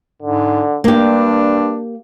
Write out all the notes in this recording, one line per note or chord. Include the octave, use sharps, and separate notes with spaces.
G#2 D3
G2 A#3 D4 G4